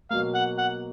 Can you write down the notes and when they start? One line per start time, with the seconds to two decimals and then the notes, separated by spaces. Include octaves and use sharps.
0.10 B2 F#3 A#3 F5
0.35 F#5
0.58 F#5